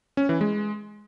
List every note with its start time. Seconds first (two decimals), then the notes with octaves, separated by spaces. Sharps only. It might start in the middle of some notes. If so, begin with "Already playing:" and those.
0.17 C#4
0.29 E3
0.41 G#3